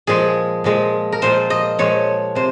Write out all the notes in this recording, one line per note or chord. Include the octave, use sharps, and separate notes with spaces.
A#2 F3 G#3 G#4
A#2 F3 G#3
A#4
A#2 F3 G#3 C5
D#5
A#2 F3 G#3 C#5
C3 C5